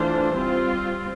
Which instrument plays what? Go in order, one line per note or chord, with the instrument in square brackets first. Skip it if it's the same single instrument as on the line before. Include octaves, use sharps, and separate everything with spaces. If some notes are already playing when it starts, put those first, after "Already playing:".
Already playing: [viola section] E3 A3 D4 F4 C5
G3 C4 F4